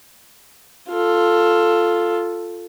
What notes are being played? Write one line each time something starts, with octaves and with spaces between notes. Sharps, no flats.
F4 A4